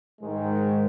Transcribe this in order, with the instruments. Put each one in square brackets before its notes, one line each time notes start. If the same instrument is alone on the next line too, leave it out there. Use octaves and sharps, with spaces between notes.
[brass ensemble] G#2 D#3 G#3